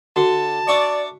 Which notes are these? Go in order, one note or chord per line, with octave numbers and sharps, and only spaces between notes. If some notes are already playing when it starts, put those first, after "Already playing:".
D3 F#4 A5
D4 D5 E5 C#6